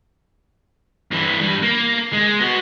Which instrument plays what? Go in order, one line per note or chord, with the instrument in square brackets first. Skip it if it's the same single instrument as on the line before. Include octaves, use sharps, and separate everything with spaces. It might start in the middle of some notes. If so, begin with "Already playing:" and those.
[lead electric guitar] G2 E3
G2 G3
A#3
G#3
B3 F#4